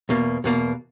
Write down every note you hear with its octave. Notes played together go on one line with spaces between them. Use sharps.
E2 B2 A#3
E2 B2 A#3